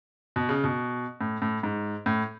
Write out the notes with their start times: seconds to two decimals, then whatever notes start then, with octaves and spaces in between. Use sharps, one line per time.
0.36 B2
0.49 C#3
0.64 B2
1.21 A2
1.42 A2
1.63 G#2
2.06 A2